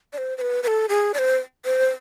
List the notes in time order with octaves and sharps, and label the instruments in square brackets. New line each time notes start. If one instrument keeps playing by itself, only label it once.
[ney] D5
C5
C5
B4
B4
A4
G#4
D5
C5
C5